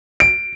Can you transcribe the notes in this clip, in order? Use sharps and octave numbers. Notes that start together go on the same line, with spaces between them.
D7